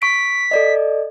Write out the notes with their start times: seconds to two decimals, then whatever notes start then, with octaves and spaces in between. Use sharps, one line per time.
0.02 C#6 B6 D7
0.51 A4 D5 D#5